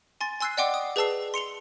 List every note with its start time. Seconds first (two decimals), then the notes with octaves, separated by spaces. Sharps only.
0.21 G#5 C6 A6
0.41 G#5 C6 E6 F#6 G#6 C7
0.57 D5 D#5 F#5 G5 C6 D6
0.74 D#6
0.96 G#4 B4 D5 A5 E6 C7
1.34 C6 C#7 F7 G7